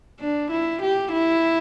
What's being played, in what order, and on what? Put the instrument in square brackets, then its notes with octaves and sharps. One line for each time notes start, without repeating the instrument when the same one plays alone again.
[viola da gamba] D4
E4
G4
E4